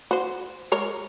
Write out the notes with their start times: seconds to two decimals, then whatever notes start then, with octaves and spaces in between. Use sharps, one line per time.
0.11 F#4 C5
0.72 G#3 A#4 C#5